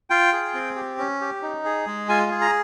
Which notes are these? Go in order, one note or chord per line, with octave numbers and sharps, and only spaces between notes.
F4 G5
G#4
C4
G4
C#4
G4
D#4
G#4
G#3
F4 G#5
G#4
A#5